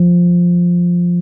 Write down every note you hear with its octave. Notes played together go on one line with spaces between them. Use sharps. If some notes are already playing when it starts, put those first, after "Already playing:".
Already playing: F3